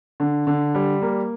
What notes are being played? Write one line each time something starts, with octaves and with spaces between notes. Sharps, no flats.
D3
D3
G3
A#3